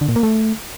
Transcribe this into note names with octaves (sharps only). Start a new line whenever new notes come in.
D3
A#2
A#3
A3